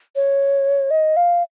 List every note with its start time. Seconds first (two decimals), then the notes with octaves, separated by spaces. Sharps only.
0.16 C#5
0.91 D#5
1.17 F5